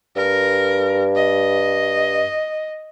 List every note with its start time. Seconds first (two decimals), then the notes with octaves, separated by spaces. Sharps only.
0.16 G2 A#4
1.15 D#5